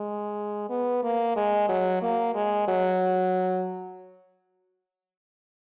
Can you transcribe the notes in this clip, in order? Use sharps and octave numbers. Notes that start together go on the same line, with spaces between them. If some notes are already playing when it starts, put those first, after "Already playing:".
Already playing: G#3
B3
A#3
G#3
F#3
A#3
G#3
F#3